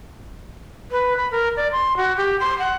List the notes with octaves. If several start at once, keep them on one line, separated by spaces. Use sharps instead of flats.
B4
B5
A#4
D5
C6
F#4
G4
C6
F#5